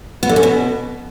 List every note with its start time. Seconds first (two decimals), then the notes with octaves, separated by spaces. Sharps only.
0.23 B3
0.29 D3
0.36 C#4
0.43 B2